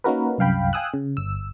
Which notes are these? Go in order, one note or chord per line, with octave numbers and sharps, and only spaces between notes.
A#3 C#4 D#4 F#4 A#4 B4
C2 F#2 F5 G5 B5
F5 G5 G#5 D#6 E6 F#6
C#3
G1 E6